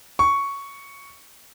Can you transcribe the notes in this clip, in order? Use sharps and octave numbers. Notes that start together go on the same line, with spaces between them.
C#6